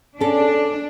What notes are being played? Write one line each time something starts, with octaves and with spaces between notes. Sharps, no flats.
C#4 D4 A4